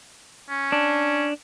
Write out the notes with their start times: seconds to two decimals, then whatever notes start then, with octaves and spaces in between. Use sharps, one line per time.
0.49 C#4
0.72 D4